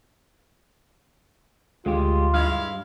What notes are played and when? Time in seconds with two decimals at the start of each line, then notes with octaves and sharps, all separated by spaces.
1.86 D2 G#3 F4 G4
2.34 G2 G#3 E4 F5